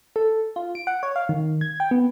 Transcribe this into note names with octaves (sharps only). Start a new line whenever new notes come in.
A4
F4
D7
F#5
C#5
F5
D#3
G#6
G5
B3